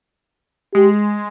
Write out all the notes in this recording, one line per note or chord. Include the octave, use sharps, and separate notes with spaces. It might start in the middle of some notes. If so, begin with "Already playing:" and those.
G#3 G4